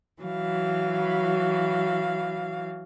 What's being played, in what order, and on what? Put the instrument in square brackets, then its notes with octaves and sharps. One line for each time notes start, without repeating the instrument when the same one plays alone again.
[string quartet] E3 F#3 F5